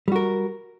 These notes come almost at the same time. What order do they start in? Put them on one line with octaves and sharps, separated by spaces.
G3 F#4 A#4